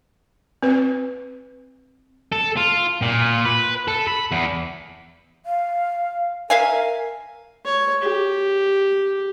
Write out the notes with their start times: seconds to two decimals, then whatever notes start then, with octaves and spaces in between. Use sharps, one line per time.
0.63 C4 B4
2.33 A4
2.57 F4
3.02 A#2
3.45 B4
3.88 A4
4.07 B5
4.31 E2
5.46 F5
6.50 A#4 E5 F5 G#5
7.65 C#5
8.01 G4